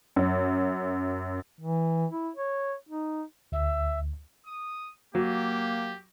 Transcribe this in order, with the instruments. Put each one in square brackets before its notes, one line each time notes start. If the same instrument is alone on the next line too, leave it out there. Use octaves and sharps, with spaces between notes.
[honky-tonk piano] F#2
[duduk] E3
E4
C#5
D#4
[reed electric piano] D2 [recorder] E5
[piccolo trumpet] D#6
[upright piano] F#3 [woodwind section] A#3 [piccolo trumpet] G4